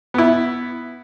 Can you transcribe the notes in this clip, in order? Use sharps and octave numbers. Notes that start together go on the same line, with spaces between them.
B3 E4